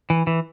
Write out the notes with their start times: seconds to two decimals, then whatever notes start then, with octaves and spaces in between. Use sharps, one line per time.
0.10 E3
0.27 E3